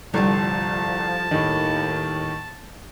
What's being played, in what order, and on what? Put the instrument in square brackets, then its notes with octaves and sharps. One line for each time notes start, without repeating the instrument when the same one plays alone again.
[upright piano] G1 C2 [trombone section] F3 [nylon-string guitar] G3 A3 [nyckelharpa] A5
[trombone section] D#2 [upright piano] A2 D#3